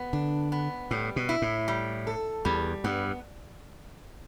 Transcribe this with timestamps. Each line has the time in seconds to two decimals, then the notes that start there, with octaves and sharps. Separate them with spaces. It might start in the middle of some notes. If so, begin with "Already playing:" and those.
Already playing: B3
0.13 D3 D4
0.52 B3
0.91 A2 G3
1.16 B2
1.29 E4
1.42 A2
1.68 G3
2.07 A4
2.45 E2 G3
2.84 G2 B3